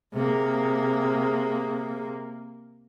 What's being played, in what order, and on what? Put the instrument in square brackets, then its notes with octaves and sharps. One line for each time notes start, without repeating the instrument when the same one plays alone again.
[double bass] C3 A#3 [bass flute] G#4